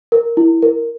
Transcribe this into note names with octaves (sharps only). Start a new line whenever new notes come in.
A#4
E4
A#4